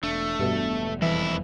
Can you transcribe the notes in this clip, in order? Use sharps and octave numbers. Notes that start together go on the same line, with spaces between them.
E1 A3 D4
E1 G2 B2 G3
F2 E3 E4